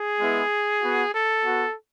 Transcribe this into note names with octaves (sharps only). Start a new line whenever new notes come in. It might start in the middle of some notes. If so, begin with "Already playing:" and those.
Already playing: G#4
G#3 B3 E4
B3 F#4
A4
B3 F#4